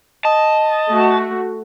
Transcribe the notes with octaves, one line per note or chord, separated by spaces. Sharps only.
D#5 A5
A3 F#4